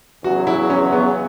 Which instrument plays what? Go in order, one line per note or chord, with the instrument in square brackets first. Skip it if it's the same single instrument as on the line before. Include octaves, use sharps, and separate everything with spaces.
[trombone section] E2 C#3 F#3 [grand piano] F#4
[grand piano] E4
C#4
B3